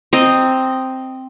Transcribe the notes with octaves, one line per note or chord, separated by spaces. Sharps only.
C4 D#5 A#5